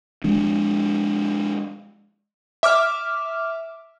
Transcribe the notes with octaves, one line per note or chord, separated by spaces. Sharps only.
F3 G#3 D4
E5 D6 F6